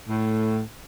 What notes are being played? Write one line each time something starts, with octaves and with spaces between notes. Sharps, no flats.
A2